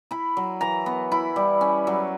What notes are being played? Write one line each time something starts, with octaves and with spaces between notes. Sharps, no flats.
E4 B5
F#3
E3 A#5
B3
E4 B5
G3
C#4
F#3